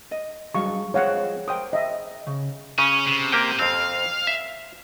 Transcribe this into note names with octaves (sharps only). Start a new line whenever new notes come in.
D#5
G2 F#3 G#3 F5 C#6
F3 G#3 C4 C#5 F5 F#5
A#4 C5 G5 D#6
D#5 E5
C#3
C#3 C#4
C3
A#3 G4 G5
F2 C4 F5
E5